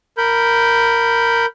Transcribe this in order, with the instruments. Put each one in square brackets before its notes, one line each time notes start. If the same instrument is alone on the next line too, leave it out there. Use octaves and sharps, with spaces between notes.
[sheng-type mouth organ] A#4 B5 G6